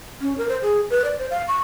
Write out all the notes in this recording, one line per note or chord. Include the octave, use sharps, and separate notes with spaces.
C#4
A#4
C5
G#4
B4
D5
C5
F5
C#6